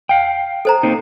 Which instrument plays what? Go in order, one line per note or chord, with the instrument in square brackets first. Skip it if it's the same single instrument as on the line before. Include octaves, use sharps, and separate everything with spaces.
[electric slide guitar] F5 G5
[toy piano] A4 C5 A#5
[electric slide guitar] A#3 C4 D#4